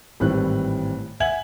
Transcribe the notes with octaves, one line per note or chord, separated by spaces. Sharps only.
G#1 A2 E3 G3 C4 F#6
E5 F#5 G#5 G#6 F#7